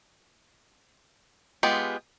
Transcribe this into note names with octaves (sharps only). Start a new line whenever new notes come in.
G#3 B3 F4 G4